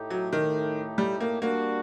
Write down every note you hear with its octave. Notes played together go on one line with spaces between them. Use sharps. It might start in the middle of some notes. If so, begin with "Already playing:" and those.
Already playing: A2 A3 D#4 G4
F#3
D#3
G3
A#3
G3 A#3 D4 F#4